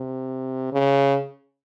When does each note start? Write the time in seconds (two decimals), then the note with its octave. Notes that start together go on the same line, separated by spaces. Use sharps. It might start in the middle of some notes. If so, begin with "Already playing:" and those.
Already playing: C3
0.73 C#3